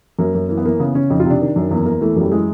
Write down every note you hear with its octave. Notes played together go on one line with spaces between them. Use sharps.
F#2 A#3
F#2
E3 A#3
B3
E3 A#3
C#3 B3
C#3 C#4
F2 D#4
F4
C3 D4
D#3
F#2
E2 A#3
E2 A#3
E3 A3
F#2 G3
E3 G#3